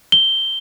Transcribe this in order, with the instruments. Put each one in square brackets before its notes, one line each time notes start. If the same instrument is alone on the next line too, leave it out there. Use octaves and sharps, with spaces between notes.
[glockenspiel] G7